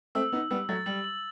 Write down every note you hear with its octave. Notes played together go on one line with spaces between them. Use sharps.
A3 C4 E6
B3 D#4 E6
G3 B3 E6
F#3 A3 A6
G3 F#7
F#7